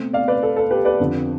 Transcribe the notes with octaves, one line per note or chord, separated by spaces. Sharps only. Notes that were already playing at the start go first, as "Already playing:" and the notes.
Already playing: B2 A3 C4
D5 F5
B4 D5
A4
A4
G4 B4
B4 D5
F2 D3 F3 C4